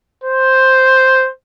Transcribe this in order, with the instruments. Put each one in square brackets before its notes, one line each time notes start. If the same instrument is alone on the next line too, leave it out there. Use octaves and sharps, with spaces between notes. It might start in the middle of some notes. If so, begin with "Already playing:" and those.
[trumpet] C5